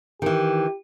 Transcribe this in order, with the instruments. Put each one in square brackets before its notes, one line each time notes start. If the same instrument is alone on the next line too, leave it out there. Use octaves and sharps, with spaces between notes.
[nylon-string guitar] D#3 E3 [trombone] G4